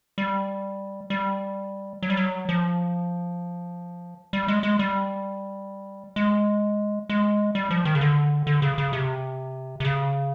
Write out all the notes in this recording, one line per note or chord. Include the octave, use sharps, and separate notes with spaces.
G3
G3
F#3
G3
F#3
F3
G3
G#3
G#3
G3
G#3
G#3
G3
F3
D#3
C#3
D3
D3
C#3
C#3
C3
C3
C#3